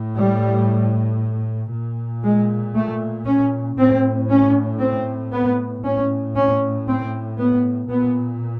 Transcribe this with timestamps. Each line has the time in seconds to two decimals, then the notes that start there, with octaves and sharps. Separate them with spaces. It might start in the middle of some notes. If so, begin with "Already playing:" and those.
Already playing: A2
0.17 G3
1.71 A#2
2.24 G#3
2.74 A3
3.26 C#4
3.77 A2 C4
4.30 C#4
4.81 C4
5.32 B3
5.84 A2 C#4
6.36 C#4
6.88 C4
7.38 B3
7.90 A#2 B3